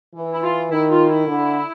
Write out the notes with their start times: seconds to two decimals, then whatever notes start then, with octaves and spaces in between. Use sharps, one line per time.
0.15 E3
0.32 E4
0.43 F4
0.71 D#3 E4
0.90 F4
1.08 E4
1.27 D3